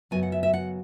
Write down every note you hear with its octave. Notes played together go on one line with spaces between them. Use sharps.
F#2 C#3 F#3 B3 G#5
F#5
E5
E5
F#5